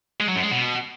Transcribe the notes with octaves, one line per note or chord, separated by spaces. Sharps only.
G#3
F#3
F#2
G#3
B2